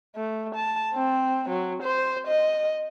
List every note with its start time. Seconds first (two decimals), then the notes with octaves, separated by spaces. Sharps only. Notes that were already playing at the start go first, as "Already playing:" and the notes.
0.16 A3
0.56 A5
0.94 C4
1.50 F#3
1.83 C5
2.27 D#5